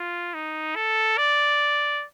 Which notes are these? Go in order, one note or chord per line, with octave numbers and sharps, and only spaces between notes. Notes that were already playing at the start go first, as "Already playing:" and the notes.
Already playing: F4
D#4
A4
D5